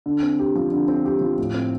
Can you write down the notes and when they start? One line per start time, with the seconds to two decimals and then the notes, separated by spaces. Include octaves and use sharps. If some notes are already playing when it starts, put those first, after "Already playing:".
0.06 D3
0.23 C4
0.39 G4
0.55 F3
0.72 D3
0.88 C4
1.05 G4
1.21 F3
1.38 A2
1.54 C4